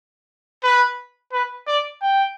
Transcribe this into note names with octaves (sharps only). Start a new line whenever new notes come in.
B4
B4
D5
G5